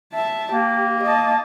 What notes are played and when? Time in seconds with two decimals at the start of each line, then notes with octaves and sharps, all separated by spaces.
0.14 E5 A5
0.52 A#3 G4
1.03 D#5 A5